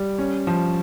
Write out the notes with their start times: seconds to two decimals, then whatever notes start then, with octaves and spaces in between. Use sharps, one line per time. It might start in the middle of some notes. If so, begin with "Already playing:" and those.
Already playing: G3
0.18 C#4
0.47 F3